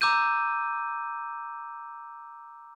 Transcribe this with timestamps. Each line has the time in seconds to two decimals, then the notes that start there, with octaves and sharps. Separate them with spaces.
0.01 A#5 D6 E6 G6 D#7